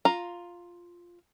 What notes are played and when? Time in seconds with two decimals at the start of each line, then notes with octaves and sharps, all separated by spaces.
0.05 F4 A#5